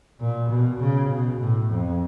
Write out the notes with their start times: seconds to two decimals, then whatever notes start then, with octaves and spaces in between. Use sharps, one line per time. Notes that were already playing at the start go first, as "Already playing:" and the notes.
0.20 A#2
0.50 B2
0.80 C#3
1.10 B2
1.40 A2
1.70 F2